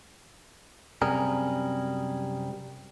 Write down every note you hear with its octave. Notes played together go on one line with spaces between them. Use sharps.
F#2 C3 G3 G#4 A#4